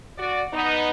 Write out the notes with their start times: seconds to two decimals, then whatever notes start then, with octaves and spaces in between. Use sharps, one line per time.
0.18 F#4 D5
0.52 B3 D#4